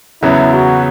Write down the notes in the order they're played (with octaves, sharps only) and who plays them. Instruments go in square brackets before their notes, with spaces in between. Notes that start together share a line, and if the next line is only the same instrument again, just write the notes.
[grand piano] E2 C#3 F#3 B3 [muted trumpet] E4
[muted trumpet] F#4